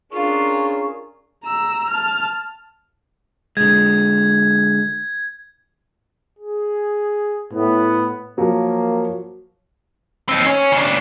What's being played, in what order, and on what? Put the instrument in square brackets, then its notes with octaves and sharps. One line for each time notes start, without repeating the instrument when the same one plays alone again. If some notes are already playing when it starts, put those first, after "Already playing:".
[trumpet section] C#4 G#4 A#4 [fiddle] D4 F4 [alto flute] C#6
[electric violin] A#5 E6
A5 F6
[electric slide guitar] D3 G#3 [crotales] G#6
[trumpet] G#4
[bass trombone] A2 [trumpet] B3
[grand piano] F3 F#3 [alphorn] A#3
[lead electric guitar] C4 D#4
C#4
C#3 D4